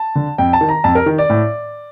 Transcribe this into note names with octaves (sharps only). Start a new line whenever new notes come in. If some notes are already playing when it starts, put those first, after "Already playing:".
Already playing: A5
D3
F2 G5
A5
D#3
A#5
F2 A5
A#4
D#3
D5
A2